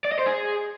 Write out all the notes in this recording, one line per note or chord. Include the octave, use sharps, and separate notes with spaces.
D5
D#5
C5
G#4